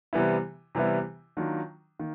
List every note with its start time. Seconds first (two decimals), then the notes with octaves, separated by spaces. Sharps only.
0.13 C3 E3 G3 B3 E4
0.75 C3 E3 G3 B3 E4
1.37 D#3 F#3 A#3 D4 F4
1.99 D#3 A#3